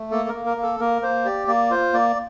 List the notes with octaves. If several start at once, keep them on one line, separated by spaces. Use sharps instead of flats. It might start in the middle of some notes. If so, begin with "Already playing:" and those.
Already playing: A3
A#3 A4
A#4
A#3
A#4
A#3
A4
A#3 A#4
A#3 C5
G4 D5
A#3 D5
F4 C5
A#3 D5